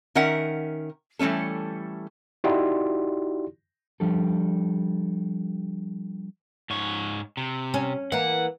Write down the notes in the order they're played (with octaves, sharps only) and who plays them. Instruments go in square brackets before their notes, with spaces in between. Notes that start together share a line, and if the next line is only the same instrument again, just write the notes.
[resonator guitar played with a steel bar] D#3 C#4 A#4 E5 F#5
E3 G3 A3 C#4 A4
[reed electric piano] D#4 E4 F#4 G4 D5 C6
[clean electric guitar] F3 G3 D4 G4 A4
[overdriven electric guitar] G#2 C#5
C3
[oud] C#4
[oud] E3 A#3 [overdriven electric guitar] F#5